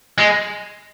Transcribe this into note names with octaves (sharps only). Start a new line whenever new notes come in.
G#3